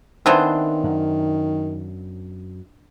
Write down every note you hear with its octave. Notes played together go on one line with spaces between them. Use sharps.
D#3 E3 B3 C4 D4 C5
F#2